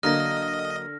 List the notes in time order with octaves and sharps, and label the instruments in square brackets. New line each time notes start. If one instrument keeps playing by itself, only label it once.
[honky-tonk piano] D3 [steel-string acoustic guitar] F#3 A#3 A5 [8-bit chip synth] D#5 [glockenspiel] F6 A#6